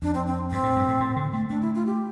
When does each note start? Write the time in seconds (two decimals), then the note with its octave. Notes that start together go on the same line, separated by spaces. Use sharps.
0.02 F2 D4
0.14 C4
0.26 C4
0.51 G2 C4
0.63 A2
0.76 G2
0.88 A2
1.00 A2
1.16 D3
1.33 A3
1.50 A3 D4
1.62 E4
1.74 F4
1.86 G4